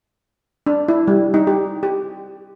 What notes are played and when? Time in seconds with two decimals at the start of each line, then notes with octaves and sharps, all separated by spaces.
0.66 D4
0.89 E4
1.08 G3
1.34 D#4
1.47 G4
1.83 G4